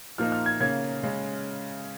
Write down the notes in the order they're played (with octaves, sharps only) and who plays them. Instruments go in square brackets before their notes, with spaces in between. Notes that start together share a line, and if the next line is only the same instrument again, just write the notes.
[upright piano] A#2 F3 A#3 D#4 [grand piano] F6
[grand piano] F6
G#6
[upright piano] C#3 A#3 C#4 [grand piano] G#6
[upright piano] C#3 G#3 C#4